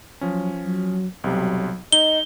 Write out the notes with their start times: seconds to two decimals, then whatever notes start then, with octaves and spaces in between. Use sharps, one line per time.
0.21 F3 F#3 C#4
0.63 F#3
1.24 B1 C3 F#3 G3
1.92 D#4 D#5 G7